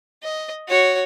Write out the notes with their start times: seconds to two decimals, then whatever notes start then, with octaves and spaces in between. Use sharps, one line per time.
0.23 D#5
0.68 F#4 C#5